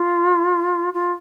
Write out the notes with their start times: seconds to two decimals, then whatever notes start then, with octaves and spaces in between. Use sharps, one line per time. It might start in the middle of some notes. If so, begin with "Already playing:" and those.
Already playing: F4
0.94 F4